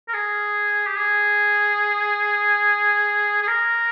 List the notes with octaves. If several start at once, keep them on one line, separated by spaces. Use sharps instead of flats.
A#4
G#4
G4
G#4
G#4
A#4